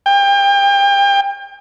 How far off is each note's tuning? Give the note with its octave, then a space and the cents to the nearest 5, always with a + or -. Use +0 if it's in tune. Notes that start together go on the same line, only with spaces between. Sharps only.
G5 +30